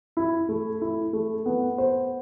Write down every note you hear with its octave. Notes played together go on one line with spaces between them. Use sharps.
E4
A3
E4
A3
B3
C5